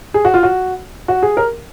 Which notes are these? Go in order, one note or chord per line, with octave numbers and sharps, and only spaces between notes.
G#4
F#4
F4
F#4
F#4
G#4
A#4